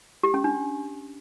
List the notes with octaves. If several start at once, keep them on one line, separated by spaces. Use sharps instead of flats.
G4
C#4
D4